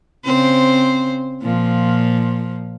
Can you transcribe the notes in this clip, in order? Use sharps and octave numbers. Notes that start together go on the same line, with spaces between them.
C#3 C4 C5
A#2 F3